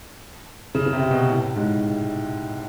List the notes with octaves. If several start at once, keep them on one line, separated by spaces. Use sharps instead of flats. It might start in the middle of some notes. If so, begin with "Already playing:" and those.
C#3
C#3
C3
B2
A2
G#2